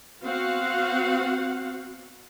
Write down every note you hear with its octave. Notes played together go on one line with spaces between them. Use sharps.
B3 C4 F#4 F5 F#5